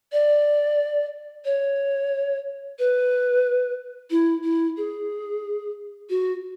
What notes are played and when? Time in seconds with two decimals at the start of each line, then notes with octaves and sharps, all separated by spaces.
0.12 D5
1.45 C#5
2.79 B4
4.11 E4
4.44 E4
4.77 G#4
6.10 F#4